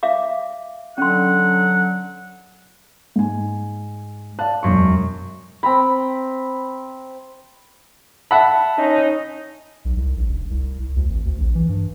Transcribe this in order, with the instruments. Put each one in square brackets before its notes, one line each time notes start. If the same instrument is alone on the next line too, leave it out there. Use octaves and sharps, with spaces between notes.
[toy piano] E5 F5 D6
[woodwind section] D3 F#3 F#5 [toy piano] C#4 C6
[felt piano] G#2 G#5
[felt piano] D5 F5 A5 [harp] F#6
[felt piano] E1 C6 [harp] F#2 C#6
[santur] C4 A#5 B5
[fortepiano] E5 F#5 B5 [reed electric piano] A5
[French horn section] C#4 D#4
[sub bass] B1
C2
A#1
F1
C2
C2
D2
G#1
D2
A#1
E3
G2